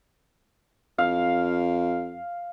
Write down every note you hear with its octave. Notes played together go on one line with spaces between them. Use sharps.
F2 F5